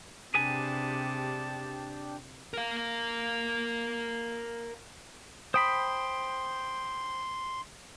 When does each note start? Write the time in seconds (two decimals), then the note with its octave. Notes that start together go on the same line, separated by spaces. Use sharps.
0.34 C3 D4 G4 G#4 B4 G#5 A5
2.54 A#4 F5
5.54 C5 G5 B5 C6 D#6